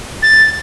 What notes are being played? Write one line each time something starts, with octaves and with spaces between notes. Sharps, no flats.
A6